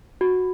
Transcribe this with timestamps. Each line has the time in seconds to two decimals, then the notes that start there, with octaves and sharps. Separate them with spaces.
0.21 F#4